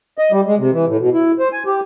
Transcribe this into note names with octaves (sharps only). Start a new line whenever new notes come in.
D#5
G3
G#3
C3
E3
A2
B2
E4
C5
G#5
G4